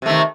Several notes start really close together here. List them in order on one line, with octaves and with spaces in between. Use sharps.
C3 A3 D#3